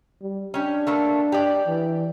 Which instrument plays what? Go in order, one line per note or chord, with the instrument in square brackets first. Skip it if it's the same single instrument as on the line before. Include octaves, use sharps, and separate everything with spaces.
[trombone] G3
[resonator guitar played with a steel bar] C#4 G4 [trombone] D4
[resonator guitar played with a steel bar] A3 A#3 A4
G4 D5
[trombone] E3